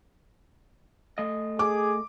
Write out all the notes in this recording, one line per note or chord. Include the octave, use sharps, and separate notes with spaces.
A3 D#5
G#4 D6